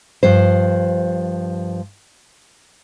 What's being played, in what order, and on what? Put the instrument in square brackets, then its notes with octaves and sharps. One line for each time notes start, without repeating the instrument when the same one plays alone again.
[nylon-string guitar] G2 F3 C5